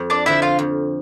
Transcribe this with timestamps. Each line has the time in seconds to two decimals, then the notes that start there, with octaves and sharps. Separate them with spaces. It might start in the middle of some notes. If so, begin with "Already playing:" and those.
Already playing: F2
0.10 D4 D5
0.26 D3 F3 E4 E5
0.42 F4 F5
0.59 F2